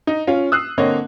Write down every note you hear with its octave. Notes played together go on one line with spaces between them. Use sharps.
D#4
C#4 F4
D#6 E6 F#6 C7
D3 A#3 C4 C#5 D#5